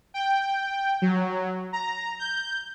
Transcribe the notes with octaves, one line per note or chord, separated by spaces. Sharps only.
G5
F#3
A#5
G6